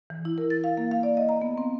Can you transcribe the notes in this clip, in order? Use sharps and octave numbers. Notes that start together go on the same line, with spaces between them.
E3
E4
A#4
A6
F5
A#3
F5
D5
D#5
A#5
B3
C4